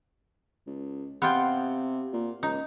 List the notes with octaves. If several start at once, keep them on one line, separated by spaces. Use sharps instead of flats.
C#2
C3 B3 F4 G5
A#2
C#2 D#4